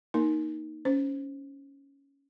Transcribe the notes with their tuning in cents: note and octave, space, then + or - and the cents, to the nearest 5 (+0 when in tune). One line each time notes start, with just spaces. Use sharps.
A#3 +0 D#4 +0 A#4 +0
C#4 +5 C5 +0